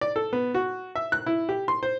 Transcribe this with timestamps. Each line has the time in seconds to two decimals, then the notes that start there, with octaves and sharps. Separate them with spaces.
0.01 D5
0.16 A4
0.33 B3
0.54 F#4
0.95 E5
1.12 F#6
1.26 E4
1.49 G4
1.68 C6
1.83 C5